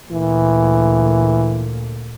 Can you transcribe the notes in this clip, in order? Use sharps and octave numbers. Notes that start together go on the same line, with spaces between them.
D2 A#2 E3